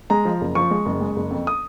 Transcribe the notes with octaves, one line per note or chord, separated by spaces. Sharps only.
G#3 A#5
F3
F#1
F3 C#6
G#3
F#1
G#3
F#1
F2
D#6